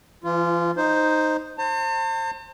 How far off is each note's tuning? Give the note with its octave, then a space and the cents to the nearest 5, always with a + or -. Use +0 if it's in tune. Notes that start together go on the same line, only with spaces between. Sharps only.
E3 +45 F4 -20
D#4 +0 C5 +0
C5 +25 A5 +45